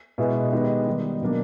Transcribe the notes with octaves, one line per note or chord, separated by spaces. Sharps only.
B2 G#3 B3 E4 G#4
D#3 G#3 B3 D#4 G4
D#3 G3 B3 D#4
B2 F#3 A#3 D4